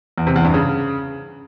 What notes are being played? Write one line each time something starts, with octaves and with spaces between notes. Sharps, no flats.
E2
C3
E2
G2
C#3